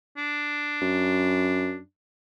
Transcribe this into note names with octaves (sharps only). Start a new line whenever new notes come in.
D4
F#2